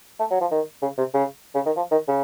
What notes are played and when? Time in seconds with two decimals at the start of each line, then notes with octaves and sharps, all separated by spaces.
0.20 A3
0.31 F#3
0.41 F3
0.51 D#3
0.82 C#3
0.98 C3
1.14 C#3
1.55 C#3
1.66 D#3
1.77 F3
1.92 D#3
2.08 C#3